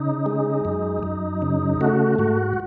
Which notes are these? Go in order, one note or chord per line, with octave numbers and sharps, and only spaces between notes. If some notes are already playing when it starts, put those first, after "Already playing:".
Already playing: C#3 D#4
G#3
F#2
F#2
C#3
A3 F#4
G#2 F#4